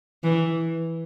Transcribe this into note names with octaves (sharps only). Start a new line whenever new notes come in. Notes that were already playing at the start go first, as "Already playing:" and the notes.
E3